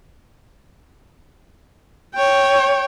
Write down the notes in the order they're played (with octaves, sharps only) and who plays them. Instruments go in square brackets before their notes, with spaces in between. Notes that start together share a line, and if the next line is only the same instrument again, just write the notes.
[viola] C#5 G5